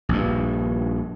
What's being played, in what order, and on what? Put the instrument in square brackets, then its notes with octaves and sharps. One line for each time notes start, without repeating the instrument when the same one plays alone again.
[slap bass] A#1 G2